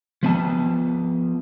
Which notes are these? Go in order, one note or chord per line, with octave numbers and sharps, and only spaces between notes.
F3 B3 A5